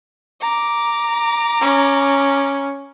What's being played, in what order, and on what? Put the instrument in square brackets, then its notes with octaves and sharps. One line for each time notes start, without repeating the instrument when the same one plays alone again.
[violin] A#5 D6
[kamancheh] C#4